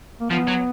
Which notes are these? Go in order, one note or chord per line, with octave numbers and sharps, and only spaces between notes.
A#3
F3 B3
F#3